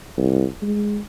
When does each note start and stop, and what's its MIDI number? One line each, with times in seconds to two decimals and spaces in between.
0.18 0.46 36
0.62 0.99 56